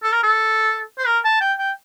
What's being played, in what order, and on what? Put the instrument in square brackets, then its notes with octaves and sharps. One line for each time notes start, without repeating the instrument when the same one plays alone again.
[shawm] A4
A#4
A4
C5
A#4
A5
G5
G5